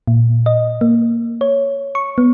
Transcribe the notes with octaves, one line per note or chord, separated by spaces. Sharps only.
A#2
D#5
A#3
C#5
C#6
B3